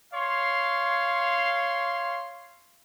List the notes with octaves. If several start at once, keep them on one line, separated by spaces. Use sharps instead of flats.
C#5 F5 C6